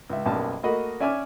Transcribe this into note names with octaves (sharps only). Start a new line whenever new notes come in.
C#2 E5
B1 F#2 G3 A#3 A5
A3 A#3 F#4 A#4 D#5 B5
C#4 D5 E5 G#5 D6 F6